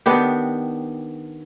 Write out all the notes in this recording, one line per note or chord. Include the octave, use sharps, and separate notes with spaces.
D#3 B3 D4 G4